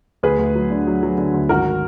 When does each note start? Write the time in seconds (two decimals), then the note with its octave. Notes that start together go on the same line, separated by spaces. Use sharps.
0.23 D2 G#4 B4
0.39 D2
0.55 F#3
0.70 D3
0.87 F#3
1.03 F#3
1.18 D3
1.34 D2
1.49 G#1 F#4 A#4